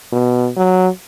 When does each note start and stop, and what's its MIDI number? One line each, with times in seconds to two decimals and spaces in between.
0.12 0.49 47
0.57 0.88 54